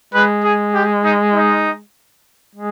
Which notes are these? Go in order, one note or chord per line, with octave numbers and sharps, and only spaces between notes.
G#3 B4
G#4
G4
D#4
D#4
G#3